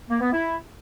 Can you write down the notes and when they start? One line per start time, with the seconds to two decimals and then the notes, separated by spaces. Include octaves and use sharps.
0.09 A#3
0.21 B3
0.33 E4